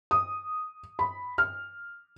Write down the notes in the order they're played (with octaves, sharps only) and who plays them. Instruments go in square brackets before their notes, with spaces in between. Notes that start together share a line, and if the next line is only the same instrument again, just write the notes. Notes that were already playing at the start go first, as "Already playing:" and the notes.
[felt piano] D#6
B5
F6